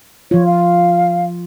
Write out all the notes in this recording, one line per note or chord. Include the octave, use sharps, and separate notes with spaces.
F3 F4 C#5
F5